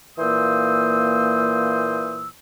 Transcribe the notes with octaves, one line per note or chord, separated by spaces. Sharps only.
A#2 E3 A#3 C5 D#6 E6